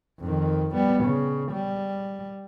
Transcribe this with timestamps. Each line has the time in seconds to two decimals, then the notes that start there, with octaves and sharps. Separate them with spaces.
0.21 F2 D#3
0.74 G3 B3
1.04 C#3
1.52 G3